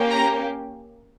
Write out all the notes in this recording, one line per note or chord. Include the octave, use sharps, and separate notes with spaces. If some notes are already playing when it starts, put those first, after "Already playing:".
Already playing: A#3 C#4 G4
A#5